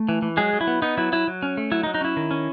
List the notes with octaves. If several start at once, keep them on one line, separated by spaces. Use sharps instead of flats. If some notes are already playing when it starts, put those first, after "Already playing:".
Already playing: A3
E3
E3
F#3 G#3 G#4
F#3
E4
B3
B3 D#4
F#3 E4
F#3 E4
F#3
C#4
A3
F#3 E4
D#4
F#3
D#4
C#4 E4
D#3
C#4